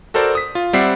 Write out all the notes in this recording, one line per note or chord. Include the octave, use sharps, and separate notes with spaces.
F#4 A4 A#4 C5 D5 A5
D#6 B6
F4
G3 C4 D5 E5 F#5 C7